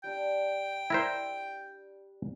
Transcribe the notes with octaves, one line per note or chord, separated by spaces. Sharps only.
G3 D4 G5
E4 A#4 C5